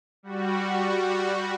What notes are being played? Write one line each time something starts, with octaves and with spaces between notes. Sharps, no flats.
G3 F#4